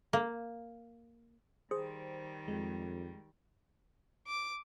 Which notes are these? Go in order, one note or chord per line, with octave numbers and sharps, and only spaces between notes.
A#3
D#3 G3 G#4 C5
F2 G#3
D6